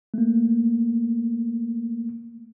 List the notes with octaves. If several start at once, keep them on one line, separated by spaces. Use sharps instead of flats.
A3 A#3